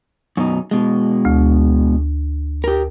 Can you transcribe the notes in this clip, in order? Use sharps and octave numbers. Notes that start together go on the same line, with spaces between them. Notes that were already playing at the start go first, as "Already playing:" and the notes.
F#2 B2 D#4
B2 G#3
D2
G4 A#4